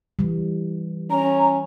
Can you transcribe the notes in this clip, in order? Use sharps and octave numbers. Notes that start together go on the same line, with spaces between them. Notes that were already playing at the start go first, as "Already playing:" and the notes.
E3 G3
C#4 A#5